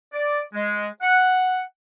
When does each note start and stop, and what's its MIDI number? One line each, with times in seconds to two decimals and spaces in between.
0.13 0.41 74
0.54 0.87 56
1.02 1.61 78